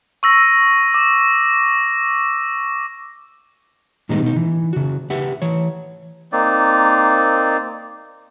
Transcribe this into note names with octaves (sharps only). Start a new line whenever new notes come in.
C#6 E6 A#6
D6
A2 D#3 G3 G#3 B3 D#4
B2 D#4
E3
C#3 F#4
G4 B4 E5 F#5
E3 C#5
A#3 C4 D#4 D5